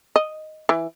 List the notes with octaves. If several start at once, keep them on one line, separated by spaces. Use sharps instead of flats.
D#5
E3